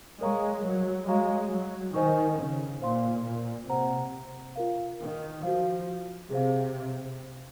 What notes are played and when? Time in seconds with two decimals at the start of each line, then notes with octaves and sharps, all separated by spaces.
0.21 G#3 A#4 C#5 F5 A#5 C#6
0.64 F#3
1.07 G#3 F#4 C#5 F5 A#5 C#6
1.51 F#3
1.94 D#3 C5 D#5 G#5 C#6
2.38 C#3
2.81 A#2 C5 F5 C6
3.25 A#2
3.69 C3 C5 F#5 A#5
4.56 F4 A#4 F5
4.99 D#3
5.43 F3 F#4 C5 F5
6.30 C3 G#4 C5 F5